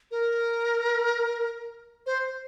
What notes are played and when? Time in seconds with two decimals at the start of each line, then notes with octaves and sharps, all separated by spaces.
0.11 A#4
2.06 C5